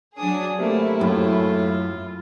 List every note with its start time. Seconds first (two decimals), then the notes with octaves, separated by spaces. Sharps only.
0.18 F#3 D4 G#4 D#6
0.58 C3 A3 A#3 E4
1.01 F#2 A2 F4